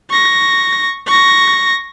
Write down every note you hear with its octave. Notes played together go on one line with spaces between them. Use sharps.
C#6 A#6
C#6 A#6